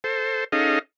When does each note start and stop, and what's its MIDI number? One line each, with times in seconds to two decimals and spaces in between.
0.04 0.44 69
0.04 0.44 72
0.52 0.79 61
0.52 0.79 63
0.52 0.79 68
0.52 0.79 69
0.52 0.79 75
0.52 0.79 77